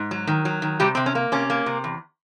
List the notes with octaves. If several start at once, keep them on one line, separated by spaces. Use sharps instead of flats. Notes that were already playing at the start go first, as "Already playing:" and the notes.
Already playing: G#2
F#3
D#3
F#3
D#3
C3 G3 G4
C3 C4
C#4
A#3
C3 C#4
A#3
C3
E2